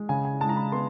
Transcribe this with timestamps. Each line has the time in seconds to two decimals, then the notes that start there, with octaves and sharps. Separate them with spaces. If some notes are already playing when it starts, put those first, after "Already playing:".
Already playing: G#3
0.09 C#3 G#5
0.25 G#5
0.41 G#3 A5
0.49 A#5
0.57 B5
0.72 B3 C6